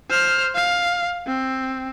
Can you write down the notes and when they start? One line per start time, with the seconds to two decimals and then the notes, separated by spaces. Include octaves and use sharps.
0.10 C5 F6
0.55 F5
1.27 C4